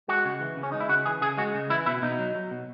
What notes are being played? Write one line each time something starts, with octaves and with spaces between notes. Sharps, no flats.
G#3 F#4
C#3
E3
C#3
C#4
G#3 D#4
E4
C#3 F#4
E3 G#4
C#3 G#4
G#3 F#4
C#3
E3 E4
B2 E4
B2 D#4
F#3
F#3
B2